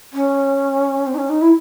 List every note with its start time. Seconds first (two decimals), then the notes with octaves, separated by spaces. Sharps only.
0.13 C#4
1.06 C4
1.14 D#4
1.18 C#4
1.29 D#4
1.41 E4